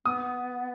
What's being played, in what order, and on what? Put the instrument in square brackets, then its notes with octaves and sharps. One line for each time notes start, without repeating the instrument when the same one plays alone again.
[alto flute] B3 [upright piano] D#6